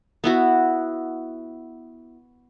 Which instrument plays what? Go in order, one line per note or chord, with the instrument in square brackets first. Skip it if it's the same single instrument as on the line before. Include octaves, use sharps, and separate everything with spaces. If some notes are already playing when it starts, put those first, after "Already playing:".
[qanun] B3 E4 F#4